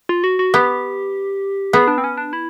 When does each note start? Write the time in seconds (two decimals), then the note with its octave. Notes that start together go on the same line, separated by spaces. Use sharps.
0.09 F4
0.24 F#4
0.39 F#4
0.54 B3 G4
1.73 B3 G#4
1.88 D4
1.98 C4
2.04 C#4
2.17 D4
2.33 E4